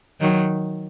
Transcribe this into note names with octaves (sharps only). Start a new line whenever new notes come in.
D#3 F#3